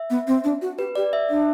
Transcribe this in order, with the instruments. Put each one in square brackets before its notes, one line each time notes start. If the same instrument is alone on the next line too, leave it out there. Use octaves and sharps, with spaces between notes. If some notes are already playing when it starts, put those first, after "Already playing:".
Already playing: [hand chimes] E5
[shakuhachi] B3
C4
D4
F#4
[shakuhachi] G4 [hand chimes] B4
[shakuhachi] G4 [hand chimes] D5
[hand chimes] E5
[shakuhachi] D4